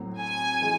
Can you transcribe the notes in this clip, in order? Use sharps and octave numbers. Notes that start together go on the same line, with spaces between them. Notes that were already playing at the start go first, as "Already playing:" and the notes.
Already playing: A2 F#3 C4
G#5
E3 G#3